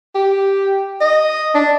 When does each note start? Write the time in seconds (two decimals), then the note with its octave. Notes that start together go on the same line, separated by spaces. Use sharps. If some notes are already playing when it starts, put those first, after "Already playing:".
0.15 G4
1.01 D#5
1.55 D4